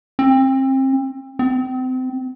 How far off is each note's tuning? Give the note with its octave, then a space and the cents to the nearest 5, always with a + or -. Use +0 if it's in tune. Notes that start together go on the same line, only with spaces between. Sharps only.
C4 +30
C4 -30